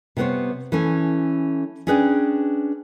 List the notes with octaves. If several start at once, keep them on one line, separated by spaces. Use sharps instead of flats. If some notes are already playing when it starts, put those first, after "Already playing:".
C3 G3 B3 A#4 C5 C#5
E3 A3 C#4
C#4 D4 G#4 B4 D5 G5